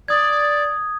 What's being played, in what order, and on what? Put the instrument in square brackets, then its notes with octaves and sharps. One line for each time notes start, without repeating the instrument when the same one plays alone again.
[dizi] D5 [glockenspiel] D#6 G#6